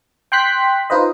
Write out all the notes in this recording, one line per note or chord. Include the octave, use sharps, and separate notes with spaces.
G5 C6 F#6 B6
D#4 F4 B4 C5 D#5